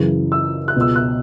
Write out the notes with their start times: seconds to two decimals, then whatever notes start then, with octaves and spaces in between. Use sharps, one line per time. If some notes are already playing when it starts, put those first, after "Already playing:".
Already playing: F#2 C#3 E3
0.32 E6
0.68 F#6
0.76 C#2 B2 E6
0.96 F#6